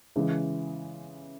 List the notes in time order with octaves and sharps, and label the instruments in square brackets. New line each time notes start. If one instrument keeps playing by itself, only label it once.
[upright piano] C#3 E3 G#3